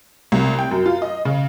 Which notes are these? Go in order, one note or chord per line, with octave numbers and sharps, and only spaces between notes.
C2
G5
F#2
F4
D#5
C#3